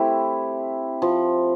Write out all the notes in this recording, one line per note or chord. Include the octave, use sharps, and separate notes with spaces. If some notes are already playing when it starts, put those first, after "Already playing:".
Already playing: A3 C4 E4 G4
F3